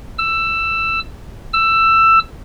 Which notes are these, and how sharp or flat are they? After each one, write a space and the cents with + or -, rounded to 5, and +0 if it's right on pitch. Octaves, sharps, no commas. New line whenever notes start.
E6 +15
E6 +15